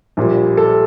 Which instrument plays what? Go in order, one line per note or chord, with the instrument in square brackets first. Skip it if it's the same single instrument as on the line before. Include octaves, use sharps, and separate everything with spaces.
[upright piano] A#1 A#2 G3
A4